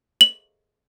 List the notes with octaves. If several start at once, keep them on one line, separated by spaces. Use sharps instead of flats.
F#7